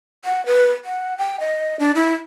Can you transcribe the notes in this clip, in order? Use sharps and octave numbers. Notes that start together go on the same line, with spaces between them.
F#5
B4
F#5
G5
D#5
D4
E4